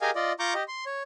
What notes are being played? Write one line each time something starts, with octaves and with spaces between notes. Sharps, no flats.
G4 G#4 A#4 D#5 F5 G#5
F4 D5 D#5
F4 A#5 C#6 D6 G6
G4 D#5
C6
C#5